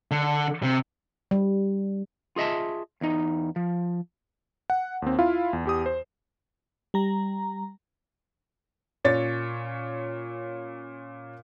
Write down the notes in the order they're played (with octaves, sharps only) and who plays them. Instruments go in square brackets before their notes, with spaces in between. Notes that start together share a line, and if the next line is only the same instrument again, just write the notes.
[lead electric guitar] D3
C3
[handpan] G3
[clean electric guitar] F4 G#4 D#5 E5 A5
E2 D#4
F3
[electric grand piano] F#5
D#2 C4
E4 F4 F5
E2
E2 G4 D#6
C5
[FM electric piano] G3 A#5
[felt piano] A#2 C#4 C#5 A6